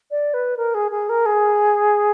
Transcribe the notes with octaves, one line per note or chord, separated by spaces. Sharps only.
D5
B4
A#4
G#4
G#4
A#4
G#4